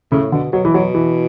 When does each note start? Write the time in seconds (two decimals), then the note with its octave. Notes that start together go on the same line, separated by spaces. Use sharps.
0.12 A2 C#3
0.32 B2 D3
0.53 B2 F#3
0.65 E3
0.74 B2 F#3
0.94 E3